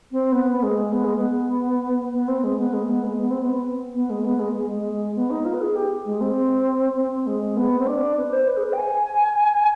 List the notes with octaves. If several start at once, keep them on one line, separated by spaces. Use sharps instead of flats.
C4
B3
B3
G#3
B3
G#3
B3
B3
C4
G#3
B3
G#3
B3
G#3
B3
C4
B3
B3
G#3
B3
G#3
G#3
G#3
B3
D#4
F4
B4
G#4
G4
G#3
C4
C4
G#3
B3
C4
D4
B4
C5
B4
G#4
B4
G5
G#5